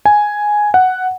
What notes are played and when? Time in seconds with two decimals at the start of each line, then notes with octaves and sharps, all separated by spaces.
0.05 G#5
0.74 F#5